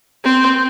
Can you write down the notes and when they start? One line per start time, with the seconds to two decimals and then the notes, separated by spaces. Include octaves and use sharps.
0.24 C4